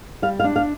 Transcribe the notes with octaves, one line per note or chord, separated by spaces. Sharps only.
G3 F5
F5
D4
F5